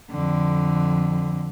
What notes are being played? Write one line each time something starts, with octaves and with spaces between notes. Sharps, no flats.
F2 D3